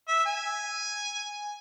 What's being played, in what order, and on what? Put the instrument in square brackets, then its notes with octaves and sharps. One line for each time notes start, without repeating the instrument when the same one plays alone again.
[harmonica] E5
G#5